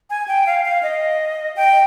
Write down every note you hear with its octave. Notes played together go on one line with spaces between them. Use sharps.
G#5
G5
F5
F5
D#5
G5